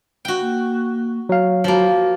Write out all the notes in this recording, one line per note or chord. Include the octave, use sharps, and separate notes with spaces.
F#4 G5
A#3
F#3 F5
F3 A#3 F#4